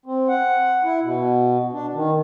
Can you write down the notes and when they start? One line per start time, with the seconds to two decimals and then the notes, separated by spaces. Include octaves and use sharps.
0.06 C4
0.28 F#5
0.84 E4
1.03 B2
1.73 D4
1.94 D#3